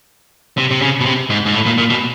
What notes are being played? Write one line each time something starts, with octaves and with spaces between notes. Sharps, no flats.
C3
C3
C#3
B2
C3
G#2
G#2
A2
A#2
A#2
B2